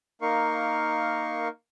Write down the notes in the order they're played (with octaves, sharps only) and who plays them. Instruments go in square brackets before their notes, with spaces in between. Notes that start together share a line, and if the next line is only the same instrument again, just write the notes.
[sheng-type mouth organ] A#3 D#4 A#4 F5 C#6